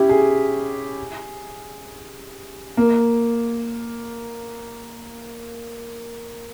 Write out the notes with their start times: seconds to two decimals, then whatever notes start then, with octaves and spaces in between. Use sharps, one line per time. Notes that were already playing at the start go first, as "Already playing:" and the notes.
Already playing: C#4 E4 G4
0.09 G#4
2.77 A#3